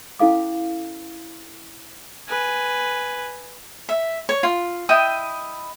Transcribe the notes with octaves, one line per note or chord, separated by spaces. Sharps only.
C#4 E4 A4 F5 D6
B4 G#5
E5
C#5
F4
E4 D#5 G5 D#6